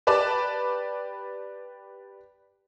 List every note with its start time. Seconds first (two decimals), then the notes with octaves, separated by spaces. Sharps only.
0.07 G4 B4 D5 A5 B5 D6